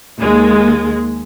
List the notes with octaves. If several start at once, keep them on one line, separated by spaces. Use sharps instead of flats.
D#2 G#3